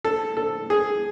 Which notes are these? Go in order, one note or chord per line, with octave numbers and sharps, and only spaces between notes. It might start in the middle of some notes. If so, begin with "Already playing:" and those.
A4
A4
G#4